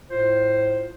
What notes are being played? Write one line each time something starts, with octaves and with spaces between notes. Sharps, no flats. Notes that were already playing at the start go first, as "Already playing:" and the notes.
A2 F4 C5